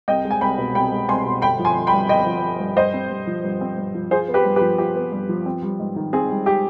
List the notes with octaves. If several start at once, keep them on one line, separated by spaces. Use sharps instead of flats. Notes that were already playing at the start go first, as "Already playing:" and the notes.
C2 D#5 G5
G#3
G#5
C2 G5 B5
B2
C2 G5 B5
G#3
C2 G#5 C6
B2
G1 G5 B5
F3
G#5 C6
G1
G5 B5
G2
G1 D#5 G5
F3
G1
G2
G2 C5 D#5
C4
G2
F3
G2
C4
G2
F3
F4 G#4 C5
B3
G4 B4
G2
G4 B4
F3
F4 G4
B3
G2
F3
C4
G3
G#2
D#3
C4 G#4
G3
G4